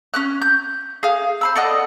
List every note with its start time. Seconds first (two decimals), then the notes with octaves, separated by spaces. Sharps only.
0.14 C#4 F6 F#6
0.42 G6
1.03 G#4 F5
1.41 C5 B5 E6
1.56 A4 D5 D#5 F#5